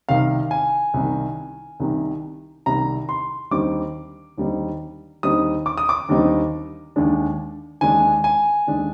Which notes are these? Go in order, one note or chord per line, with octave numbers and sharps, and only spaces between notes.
C2 C3 D#3 F5
G#5
C2 C3 D#3
C2 C3 D#3
C2 C3 D#3 A#5
C6
D#2 D3 G3 C4 D#4 D6
D#2 D3 G3 C4 D#4
D#2 D3 G3 C4 D#4 D#6
D6
D#6
D6
D#2 D3 G3 C4 D#4
D#2 D3 G#3 D4
D#2 D3 G#3 D4 G#5
G#5
D#2 D3 G#3 D4